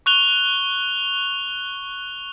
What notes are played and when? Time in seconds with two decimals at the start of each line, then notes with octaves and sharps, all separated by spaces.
0.06 C#6 F#6 F7 G7